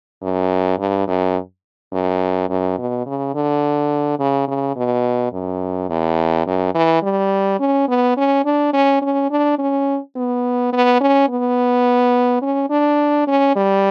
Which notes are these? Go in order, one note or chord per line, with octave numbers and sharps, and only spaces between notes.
F#2
G2
F#2
F#2
F#2
B2
C#3
D3
C#3
C#3
B2
F#2
E2
F#2
E3
G3
C#4
B3
C#4
D4
C#4
C#4
D4
C#4
B3
B3
C#4
B3
C#4
D4
C#4
G3